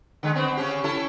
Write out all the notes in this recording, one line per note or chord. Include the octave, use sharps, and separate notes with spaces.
D3 G#3
B3 C4
C#3 C#4 G4
C#4 E4 A4